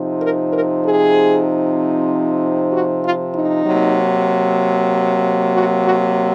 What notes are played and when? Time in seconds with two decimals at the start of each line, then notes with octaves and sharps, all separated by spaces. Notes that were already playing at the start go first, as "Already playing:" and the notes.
Already playing: C3 F3 C4 D#4
0.20 A#4
0.51 A#4
0.82 G#4
2.71 F#4
3.02 F4
3.32 D#4
3.64 C3 F#3 A#3
5.52 F#4
5.83 F#4